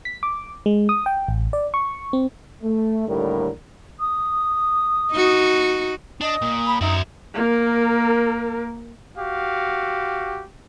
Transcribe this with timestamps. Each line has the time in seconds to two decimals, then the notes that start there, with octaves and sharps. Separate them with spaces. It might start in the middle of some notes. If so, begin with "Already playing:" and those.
0.05 B6
0.23 D6
0.66 G#3
0.89 D#6
1.06 G5
1.28 A1
1.53 D5
1.74 C#6
2.13 C4
2.63 A3
3.07 D#2 A2 D3 G3 A#4
3.99 D#6
5.12 D#4 F#4
6.21 D4 D#5 D#6
6.42 A#2
6.66 B5
6.81 F#2 D#4 F#4 E5
7.34 A#3 A#4
9.17 F#4 G4 F5